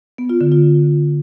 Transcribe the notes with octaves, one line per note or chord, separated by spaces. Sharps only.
B3
F4
D3
F4